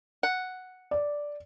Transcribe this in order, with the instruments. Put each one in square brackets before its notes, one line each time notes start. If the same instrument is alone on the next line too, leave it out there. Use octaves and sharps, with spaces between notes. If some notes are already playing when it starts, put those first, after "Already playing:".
[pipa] F#5
[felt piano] D5